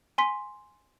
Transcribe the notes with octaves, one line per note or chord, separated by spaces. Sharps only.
G#5 C6 B6